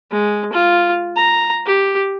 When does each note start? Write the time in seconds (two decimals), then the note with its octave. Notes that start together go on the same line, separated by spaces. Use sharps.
0.12 G#3
0.53 F4
1.16 A#5
1.66 G4